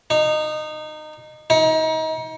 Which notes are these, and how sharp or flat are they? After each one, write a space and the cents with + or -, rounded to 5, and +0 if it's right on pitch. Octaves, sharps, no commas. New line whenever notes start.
D#4 -20
D#4 +30